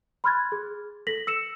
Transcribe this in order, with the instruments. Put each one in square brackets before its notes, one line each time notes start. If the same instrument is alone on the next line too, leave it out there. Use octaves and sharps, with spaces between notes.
[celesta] B5 C6 F6 F#6 G#6 A6
G#4
A4 A#6 B6 F#7
E6 C#7 E7